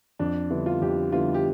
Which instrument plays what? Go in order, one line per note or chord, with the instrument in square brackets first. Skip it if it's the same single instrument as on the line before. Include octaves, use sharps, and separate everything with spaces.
[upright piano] F2 [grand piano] D4
[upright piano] D3 G3 B3 E4
[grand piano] F4
[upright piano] F2 [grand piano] G4
[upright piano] D3 G3 B3 E4 [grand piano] F4
[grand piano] G4